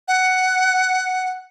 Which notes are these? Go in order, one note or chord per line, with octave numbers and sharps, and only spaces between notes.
F#5